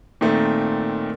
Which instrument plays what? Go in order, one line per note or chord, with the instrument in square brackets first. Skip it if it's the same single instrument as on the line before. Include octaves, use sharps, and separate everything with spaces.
[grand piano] A#2 D#3 A3 C4